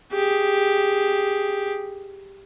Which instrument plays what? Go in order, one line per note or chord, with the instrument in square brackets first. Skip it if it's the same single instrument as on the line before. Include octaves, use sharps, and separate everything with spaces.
[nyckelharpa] G4 G#4